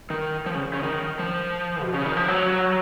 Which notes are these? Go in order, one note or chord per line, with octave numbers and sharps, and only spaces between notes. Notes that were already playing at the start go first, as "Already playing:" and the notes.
D#3
F3
C#3
C#3
D#3
F3
B2
C#3
D#3
F3
F#3